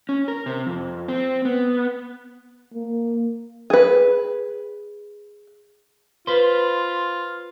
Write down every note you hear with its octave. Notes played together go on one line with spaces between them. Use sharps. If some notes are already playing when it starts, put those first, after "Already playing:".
C#4
A#4
C3
F2
C4
B3
A#3
G#4 B4
F4 B4 C5